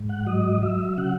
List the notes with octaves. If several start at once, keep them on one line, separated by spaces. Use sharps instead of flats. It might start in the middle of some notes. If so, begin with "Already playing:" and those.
Already playing: G#2
F#5
F#3 D#5
F#3 E5
C#3 F#5